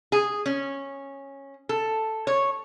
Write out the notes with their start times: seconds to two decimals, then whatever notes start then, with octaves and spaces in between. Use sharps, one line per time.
0.12 G#4
0.46 C#4
1.69 A4
2.27 C#5